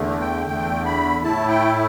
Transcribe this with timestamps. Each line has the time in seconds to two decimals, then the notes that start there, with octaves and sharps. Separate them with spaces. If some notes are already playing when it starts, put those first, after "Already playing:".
Already playing: E2 D3 A3
0.21 G5
0.46 E2 D3 A3 G5
0.85 B5
1.23 A2 A3 E4 A5
1.48 G5